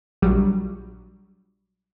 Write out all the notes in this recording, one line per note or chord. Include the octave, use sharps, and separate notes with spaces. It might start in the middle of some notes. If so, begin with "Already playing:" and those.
A#1 F#3 G3